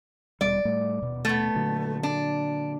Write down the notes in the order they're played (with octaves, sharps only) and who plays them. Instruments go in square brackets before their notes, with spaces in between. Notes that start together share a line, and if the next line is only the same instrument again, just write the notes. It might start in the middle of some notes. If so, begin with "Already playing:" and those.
[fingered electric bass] D#1 B2 G3 [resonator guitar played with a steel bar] D5
[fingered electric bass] A2 G3 A3
D#1 B2
[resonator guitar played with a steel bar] A3 B3
[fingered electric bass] A#2 D3 F#3
[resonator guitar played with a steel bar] D4